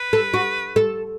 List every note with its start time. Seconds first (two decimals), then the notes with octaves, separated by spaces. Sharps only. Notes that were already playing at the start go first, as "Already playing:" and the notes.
Already playing: B4
0.13 A4
0.34 F#4
0.76 A4